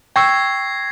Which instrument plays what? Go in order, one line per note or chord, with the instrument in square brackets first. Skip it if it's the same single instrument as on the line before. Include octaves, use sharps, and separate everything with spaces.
[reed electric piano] G5 C#6 E6 [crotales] G#6 A#6 C7